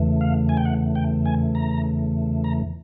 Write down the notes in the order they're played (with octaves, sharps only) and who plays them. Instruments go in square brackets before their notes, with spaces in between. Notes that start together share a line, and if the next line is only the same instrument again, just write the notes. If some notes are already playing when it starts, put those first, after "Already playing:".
Already playing: [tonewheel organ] E2 C#3 E3 A3
F5
G#5
G5
F#5
G5
G#5
A#5
A#5